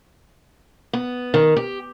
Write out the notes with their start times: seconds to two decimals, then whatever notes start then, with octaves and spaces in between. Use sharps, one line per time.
0.93 B3
1.34 D#3
1.56 G4